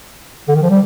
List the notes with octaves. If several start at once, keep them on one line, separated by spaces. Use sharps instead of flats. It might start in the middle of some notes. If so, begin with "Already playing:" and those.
D3
D#3
F3
G3